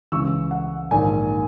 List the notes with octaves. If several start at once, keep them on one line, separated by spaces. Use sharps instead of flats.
C#2 C#3 E3 C#6 E6
F#5
A#1 G#2 D#3 G#5